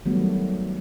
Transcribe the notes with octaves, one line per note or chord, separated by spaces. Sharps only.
D#3 F#3 G3 A3 B3